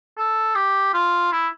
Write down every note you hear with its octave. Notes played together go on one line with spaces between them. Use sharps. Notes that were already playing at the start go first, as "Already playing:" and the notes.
A4
G4
F4
E4